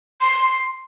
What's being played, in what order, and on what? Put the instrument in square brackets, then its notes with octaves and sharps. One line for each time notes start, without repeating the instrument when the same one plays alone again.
[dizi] C6